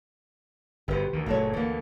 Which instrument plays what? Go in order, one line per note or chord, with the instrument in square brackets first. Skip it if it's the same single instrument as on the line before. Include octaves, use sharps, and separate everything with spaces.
[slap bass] G1 B2 [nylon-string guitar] G4 B4 C5
[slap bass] D2 D#3
[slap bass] F#1 A#2 F#3 [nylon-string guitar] A3 A4 C#5
[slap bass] D2 D3 [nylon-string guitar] E3 A#3